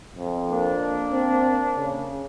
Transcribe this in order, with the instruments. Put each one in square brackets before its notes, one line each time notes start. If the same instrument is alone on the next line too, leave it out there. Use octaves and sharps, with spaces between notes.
[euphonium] F2
[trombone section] A#3 D4
[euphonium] C4
C#3